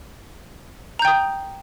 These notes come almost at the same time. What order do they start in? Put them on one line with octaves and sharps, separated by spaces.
A#5 G6 G5 D#6